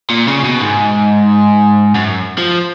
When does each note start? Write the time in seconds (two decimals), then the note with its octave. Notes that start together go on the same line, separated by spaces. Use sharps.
0.10 A#2
0.28 C#3
0.44 B2
0.61 G#2
1.95 F#2
2.38 F3